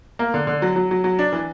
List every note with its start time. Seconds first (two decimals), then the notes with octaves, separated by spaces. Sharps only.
0.19 A#3
0.34 D3
0.47 D3
0.62 F#3
0.76 F#3
0.91 F#3
1.04 F#3
1.19 D4
1.33 E3